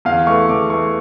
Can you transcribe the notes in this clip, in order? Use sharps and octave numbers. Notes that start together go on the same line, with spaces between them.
E2 F5
E3 A3 C#6
E2 D6
E3 A3 C#6